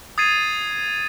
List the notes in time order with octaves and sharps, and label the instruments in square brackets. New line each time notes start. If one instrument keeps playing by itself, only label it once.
[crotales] D#6 G#6 A6 C7 D#7